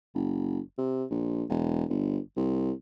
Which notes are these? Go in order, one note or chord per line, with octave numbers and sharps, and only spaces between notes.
F#1
C3
A#1
E1
G1
C2